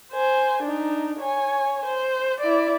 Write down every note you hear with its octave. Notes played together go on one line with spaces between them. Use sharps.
C5 G#5
D4 D#4
C#5 G#5
C5
E4 D5